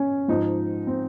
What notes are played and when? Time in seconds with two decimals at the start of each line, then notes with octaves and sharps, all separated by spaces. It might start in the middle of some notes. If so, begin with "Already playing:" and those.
Already playing: C#4
0.28 G#2 F3 D#4
0.87 C4